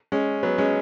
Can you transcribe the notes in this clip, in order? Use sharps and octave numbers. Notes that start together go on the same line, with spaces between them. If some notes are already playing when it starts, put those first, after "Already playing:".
G#3 C#4
F#3 B3
G#3 C#4